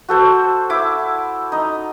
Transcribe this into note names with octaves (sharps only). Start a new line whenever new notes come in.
F#4 A4 C5
E4 D6
D#4